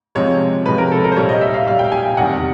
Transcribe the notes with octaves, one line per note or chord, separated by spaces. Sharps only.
C3 F3 G#3 C#5
C3 F3 G#3 B4
A#4
A4
A#4
C5
A#2 G3 C#5
D#5
E5
F5
A#2 G3 F5
G5
G#5
G5
E2 C3 D#3 G3 F#5